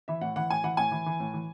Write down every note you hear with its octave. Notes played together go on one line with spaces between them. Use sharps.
E3 E5
A2 F#5
E3 F#5
A2 G#5
E3 F#5
A2 G#5
E3
E3
A2
E3